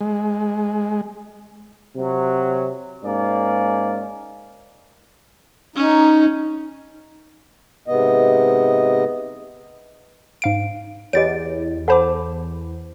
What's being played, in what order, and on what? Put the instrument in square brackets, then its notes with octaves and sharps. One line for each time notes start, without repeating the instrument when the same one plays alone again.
[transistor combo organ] G#3
[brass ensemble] C3 F#3
G#2 A#3 C#4 D5
[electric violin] C#4 [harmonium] D#4
[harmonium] G#2 C3 B3 D#5
[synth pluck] G#2 F5 D7
[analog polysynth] E2 [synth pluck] G4 A6 D7 [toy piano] C#5 D#5
[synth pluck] A4 C5 D6 [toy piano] F#5 A5 B5